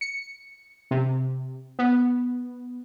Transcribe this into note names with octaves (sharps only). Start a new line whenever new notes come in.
C#7
C3
B3